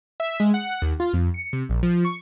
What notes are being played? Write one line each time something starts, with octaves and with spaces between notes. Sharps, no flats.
E5
G#3
F#5
D#2
F4
F2
C#7
C3
A#1
F3
C#6